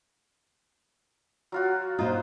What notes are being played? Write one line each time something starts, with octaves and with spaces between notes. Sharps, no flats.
F#3 F4 F#4
A#2 D#4 F4 C5